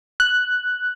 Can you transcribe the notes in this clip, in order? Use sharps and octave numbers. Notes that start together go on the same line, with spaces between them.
F#6